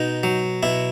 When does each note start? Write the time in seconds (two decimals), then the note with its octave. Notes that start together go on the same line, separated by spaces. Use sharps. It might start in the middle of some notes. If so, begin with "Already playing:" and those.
Already playing: B2 D#4
0.23 F#3
0.63 B2 E4